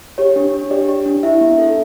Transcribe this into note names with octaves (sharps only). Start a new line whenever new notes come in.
G4 C#5
D4
D4
G4 D5
G4
D4
E4 E5
B3
A4